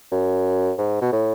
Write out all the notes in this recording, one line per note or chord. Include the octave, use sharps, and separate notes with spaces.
F#2
G#2
B2
A2